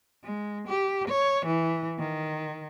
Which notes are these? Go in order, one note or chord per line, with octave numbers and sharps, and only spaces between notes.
G#3
G4
C#5
E3
D#3